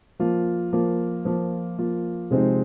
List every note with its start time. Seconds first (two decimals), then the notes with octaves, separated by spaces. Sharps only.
0.20 F3 A#3 F4
0.73 F3 A#3 F4
1.25 F3 A#3 F4
1.78 F3 A#3 F4
2.31 C3 F3 G#3 C4 D#4